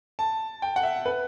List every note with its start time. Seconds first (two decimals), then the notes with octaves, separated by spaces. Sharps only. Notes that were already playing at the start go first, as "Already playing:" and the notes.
0.19 A5
0.62 G5
0.76 F#5
0.83 E5
1.06 B4